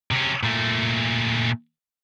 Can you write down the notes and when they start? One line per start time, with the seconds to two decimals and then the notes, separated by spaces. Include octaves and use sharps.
0.11 C3 C#4
0.43 A#2 A3